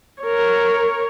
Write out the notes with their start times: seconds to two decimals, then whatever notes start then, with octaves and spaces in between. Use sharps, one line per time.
0.23 A#4 C#5